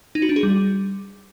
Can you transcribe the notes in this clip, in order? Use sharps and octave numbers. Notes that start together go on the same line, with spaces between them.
D#4
F#4
D4
G#4
G3